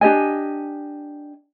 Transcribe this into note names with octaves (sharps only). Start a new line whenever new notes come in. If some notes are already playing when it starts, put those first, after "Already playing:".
D4 G4 D#5 G#5